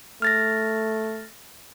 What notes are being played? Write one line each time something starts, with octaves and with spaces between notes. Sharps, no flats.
A3 F6 A6 A#6